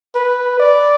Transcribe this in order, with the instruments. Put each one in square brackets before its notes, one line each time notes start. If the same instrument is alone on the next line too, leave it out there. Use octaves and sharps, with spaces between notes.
[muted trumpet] B4
D5